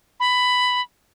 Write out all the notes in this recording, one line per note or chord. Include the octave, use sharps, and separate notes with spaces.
B5